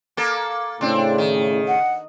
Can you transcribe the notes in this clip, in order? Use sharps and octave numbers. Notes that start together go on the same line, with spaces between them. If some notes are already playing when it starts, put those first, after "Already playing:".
A#3 A4
A2 C#3 C4 D4
D#3
F#5